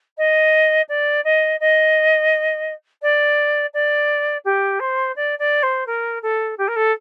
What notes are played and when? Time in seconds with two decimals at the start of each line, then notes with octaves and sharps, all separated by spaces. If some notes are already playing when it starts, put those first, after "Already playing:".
0.17 D#5
0.88 D5
1.24 D#5
1.60 D#5
3.02 D5
3.73 D5
4.44 G4
4.79 C5
5.15 D5
5.39 D5
5.62 C5
5.86 A#4
6.22 A4
6.58 G4
6.68 A#4
6.76 A4